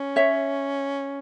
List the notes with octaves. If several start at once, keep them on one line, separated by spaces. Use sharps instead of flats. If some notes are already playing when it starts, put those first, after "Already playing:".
Already playing: C#4
C#5 E5